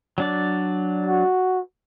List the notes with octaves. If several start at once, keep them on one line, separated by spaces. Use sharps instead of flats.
F#3 D4 D5
F#4